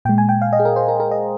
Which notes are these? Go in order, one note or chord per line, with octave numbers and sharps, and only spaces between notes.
A#2 G#3 G5
G#5
G5
F5
D#5
G#4
A#4
C5
A#4
A#4
D#5